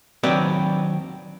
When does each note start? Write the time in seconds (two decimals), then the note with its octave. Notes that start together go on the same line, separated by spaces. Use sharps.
0.23 D#3 F#3 C4 D4 B4 D5